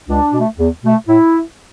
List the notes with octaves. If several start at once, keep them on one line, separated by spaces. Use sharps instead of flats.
C#2 D4
B2 A3
E2
B2 A3
A2 E4